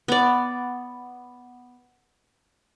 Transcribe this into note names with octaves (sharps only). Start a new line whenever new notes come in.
B3 D5